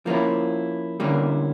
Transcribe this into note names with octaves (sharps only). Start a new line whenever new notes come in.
F3 A#3 C#4 E4
D3 G3 A#3 C#4 E4